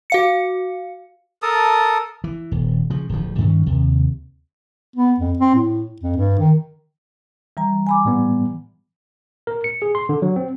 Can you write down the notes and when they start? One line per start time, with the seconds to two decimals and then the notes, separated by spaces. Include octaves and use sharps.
0.10 F#4 F5 C#7
1.42 A4 A#4 A5 D#6
2.24 E3
2.52 D#1
2.90 C#3 F3
3.09 D1 D2 F3
3.38 G2 D#3 C#4
3.66 D#2 C3
4.96 B3
5.20 F2
5.39 C4
5.55 A2
6.02 F2
6.17 G2
6.39 D#3
7.57 E3 G3 A#5
7.87 G#5 B5 D6
8.05 A2 G3 B3
9.47 A#4
9.64 C#7
9.82 G#4
9.95 C6
10.09 D3
10.22 F#3
10.36 C4